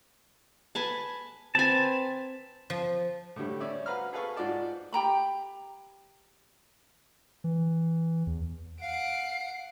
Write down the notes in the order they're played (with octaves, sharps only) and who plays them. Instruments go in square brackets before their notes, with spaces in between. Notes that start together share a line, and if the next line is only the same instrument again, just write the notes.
[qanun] B4 G#5 A5
[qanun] C4 G#5 [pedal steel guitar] B4 A5
[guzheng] F3
[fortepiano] A2 D3 G3
C#4 D5 E5
F#4 B4 F5 A#5 B5 F6
G#4 A4 B4 F5 B5 C#6
G#2 F4 F#4 D5 A5
[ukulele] G4 G5 A#5 B5
[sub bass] E3
E2
[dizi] F5 [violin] F#5 D7 [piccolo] C7